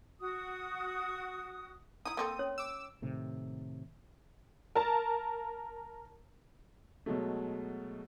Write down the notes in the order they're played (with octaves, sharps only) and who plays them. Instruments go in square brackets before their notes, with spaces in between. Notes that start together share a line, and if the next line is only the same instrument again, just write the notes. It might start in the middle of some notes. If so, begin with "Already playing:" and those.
[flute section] F#4 D#6
[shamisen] D#4 E4 [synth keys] D#6
[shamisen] A#3 C4 A4
[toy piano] C#4 C#5
[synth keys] D6 E6
[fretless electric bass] A2 C3 D#3
[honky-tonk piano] A#4 A5
[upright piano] B2 F#3 G#3 A3